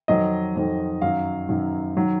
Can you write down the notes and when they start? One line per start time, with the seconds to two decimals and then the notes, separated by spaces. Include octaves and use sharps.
0.08 F2 D#3 F#3 D#5
0.56 F2 D#3 F#3
1.02 F#2 D#3 F#3 F5
1.49 F#2 D#3 F#3
1.96 D#3 F#3